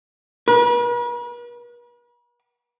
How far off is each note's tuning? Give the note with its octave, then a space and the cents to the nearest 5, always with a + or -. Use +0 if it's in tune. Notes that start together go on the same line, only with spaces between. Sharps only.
B4 -45